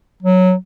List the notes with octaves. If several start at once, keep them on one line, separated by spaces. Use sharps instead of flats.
F#3